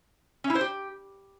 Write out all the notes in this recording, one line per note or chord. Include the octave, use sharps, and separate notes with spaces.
C#4
E4
C5
G4